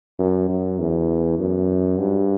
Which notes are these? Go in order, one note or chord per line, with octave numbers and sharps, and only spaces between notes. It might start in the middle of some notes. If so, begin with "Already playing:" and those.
F#2
F#2
E2
F#2
G2